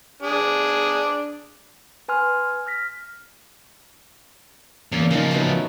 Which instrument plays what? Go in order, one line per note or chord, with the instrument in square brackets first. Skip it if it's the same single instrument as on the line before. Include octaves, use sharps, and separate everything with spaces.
[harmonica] D4 G#4
[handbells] B4 G#5 C6 F6
F6 A#6 B6
[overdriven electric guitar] E2 [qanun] A#3 C#4
[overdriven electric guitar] C#3 F3 [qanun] D#4 A#4
[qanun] F#3 A3 B3